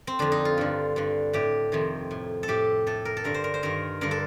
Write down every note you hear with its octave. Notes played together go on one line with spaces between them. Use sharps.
C4
F2 D3 D4
D#4
F4
G2 D3
G2 D3
A2 G4
F2 C3 D#3
A2
A4
A2 G4
A2 A4
A#4
A4
G2 D3 A#4
C5
A#4
C5
G2 D#3 A#4
G2 D3 A#4
A4